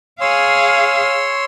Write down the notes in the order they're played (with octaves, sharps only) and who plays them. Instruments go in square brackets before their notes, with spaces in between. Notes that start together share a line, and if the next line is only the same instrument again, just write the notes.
[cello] G#4 F5 [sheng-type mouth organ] C#5 C6 E6